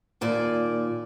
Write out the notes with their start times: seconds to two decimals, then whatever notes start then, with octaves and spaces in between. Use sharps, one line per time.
0.21 D#2 A#2 D5